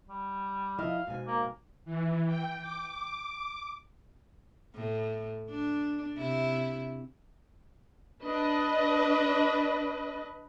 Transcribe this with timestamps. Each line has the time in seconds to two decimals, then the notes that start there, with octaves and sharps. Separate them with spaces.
0.09 G3
0.79 F3 E4 D#5 F5
1.07 G#2 B2 G#5
1.28 A#3
1.85 E3
2.27 G5
2.62 D6
4.75 A2
5.50 D4
6.16 C3 E4
8.22 D4 B4 D#5